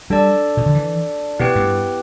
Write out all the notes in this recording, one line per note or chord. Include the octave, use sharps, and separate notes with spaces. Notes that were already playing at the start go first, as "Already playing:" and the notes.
G3 D4 A4 D5 A5
B2
D3
E3
B2 B3 E4 G4 B4 G5
G2